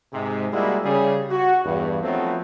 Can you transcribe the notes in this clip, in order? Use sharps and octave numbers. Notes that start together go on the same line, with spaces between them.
G#2 C3 G#3
G3 G#3 A#3 E4 F#4
C#3 G3 G#4
F#4
E2 G2
F2 F3 F#3 A3 B3 C4